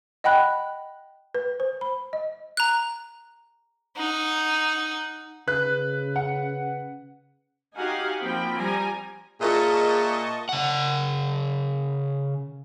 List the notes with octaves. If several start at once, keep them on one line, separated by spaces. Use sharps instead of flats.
D#5 F#5 G5 B5 F#6
B4
C5
B5
D#5
A#5 F#6
D#4 F#5
C#3 B4 F#6
F#5
D#4 F#4 G4 F5 F#5 G#5
F3 A#3 C4 G5 B5
F3 G3 G#5 A#5
A#2 F4 G#4 A#4 D#5 E5 A5 C#6
C#3 F#5